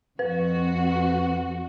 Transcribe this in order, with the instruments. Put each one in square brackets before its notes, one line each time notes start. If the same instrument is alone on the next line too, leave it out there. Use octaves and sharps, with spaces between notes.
[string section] F2 F#4 [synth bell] B4